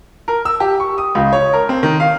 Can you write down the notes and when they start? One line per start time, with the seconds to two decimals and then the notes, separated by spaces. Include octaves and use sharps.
0.28 A#4
0.45 E6
0.60 G4
0.80 C#6
0.98 D#6
1.15 C#2
1.33 C#5
1.53 A#4
1.69 C4
1.83 D#3
2.00 F5